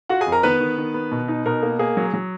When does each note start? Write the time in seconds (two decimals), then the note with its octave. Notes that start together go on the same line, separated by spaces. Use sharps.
0.09 F4 F#4 F#5
0.21 G#4 G#5
0.27 F2
0.32 A#4 A#5
0.43 D#3 B3 B4
0.60 D#3
0.78 D#3
0.94 B3
1.12 B2
1.28 D#4
1.46 B2 A#4
1.62 A#3
1.79 A#3 G#4
1.97 F#3
2.14 F#3